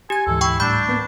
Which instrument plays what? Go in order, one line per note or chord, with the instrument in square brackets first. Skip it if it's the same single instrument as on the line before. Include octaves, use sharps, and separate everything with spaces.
[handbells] G4 G#6 [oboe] G#5
[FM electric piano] D2 G#2 E3 [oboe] A4
[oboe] E4 [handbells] G5 C#6
[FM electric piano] A2 G3 G6 [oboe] D4 [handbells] B5
[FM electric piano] A#3 B3